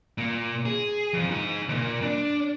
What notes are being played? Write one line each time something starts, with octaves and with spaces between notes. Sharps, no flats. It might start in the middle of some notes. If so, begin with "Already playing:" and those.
A#2
G#4
F2 F3
D#4 G#5
D#2 A#2
D4